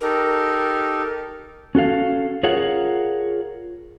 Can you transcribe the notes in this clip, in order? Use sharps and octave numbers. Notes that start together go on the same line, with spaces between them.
D#4 G4 A4 A#4
C#4 F#4 A4 F5
F4 G#4 A#4 C#5 F5 F#5